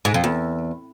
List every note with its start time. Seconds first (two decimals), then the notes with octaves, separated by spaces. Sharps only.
0.05 G#2
0.14 F2
0.24 E2